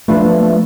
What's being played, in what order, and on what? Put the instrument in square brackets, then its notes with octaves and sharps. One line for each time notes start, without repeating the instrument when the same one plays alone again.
[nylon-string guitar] F3 B3 D4 F4 B4 [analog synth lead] A3
[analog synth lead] A3
A3